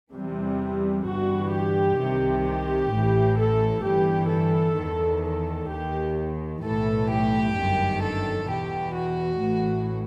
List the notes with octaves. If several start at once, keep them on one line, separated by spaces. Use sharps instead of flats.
E2 C3 E3 G3
G1 G2 E3 F#4
G4
C2 C3 D#3
G4
A1 A2 E3
A4
G1 G2 E3 G4
A4
E2 D#3
A4
D#2 D#3 G4
B1 A2 E3 A4
G4
G1 F#2 D#3
A4
E2 B2 G4
F#4
A1 A2 E3